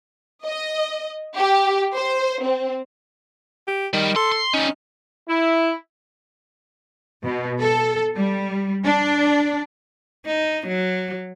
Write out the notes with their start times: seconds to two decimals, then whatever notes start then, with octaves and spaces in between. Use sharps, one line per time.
0.46 D#5
1.37 G4
1.95 C5
2.43 C4
3.67 G4
3.94 D#3 G3
4.16 A4 C6
4.32 C6
4.53 G3 C#4 D#4
5.28 E4
7.24 B2
7.61 A4
8.16 G3
8.84 D4
10.26 D#4
10.67 F#3